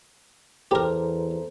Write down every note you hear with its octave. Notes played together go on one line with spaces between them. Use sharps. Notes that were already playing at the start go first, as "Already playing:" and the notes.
E2 G4 A4 A#4 C5 A#5